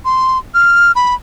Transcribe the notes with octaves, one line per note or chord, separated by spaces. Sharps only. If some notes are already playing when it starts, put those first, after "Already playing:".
C6
F6
B5